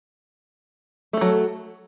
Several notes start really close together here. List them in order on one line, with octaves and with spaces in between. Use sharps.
A3 A4 F#3